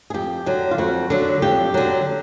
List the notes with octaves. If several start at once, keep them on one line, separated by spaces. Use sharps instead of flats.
G#4
F2 G4
D3 F#3
F4
F2 F#4
D3 F#3
F2 G4
D3 F#3